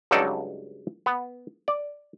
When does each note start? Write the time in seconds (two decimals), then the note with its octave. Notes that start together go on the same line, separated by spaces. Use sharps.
0.11 C#2 G2 F#3 D#4 A4 D5
1.06 B3
1.68 D5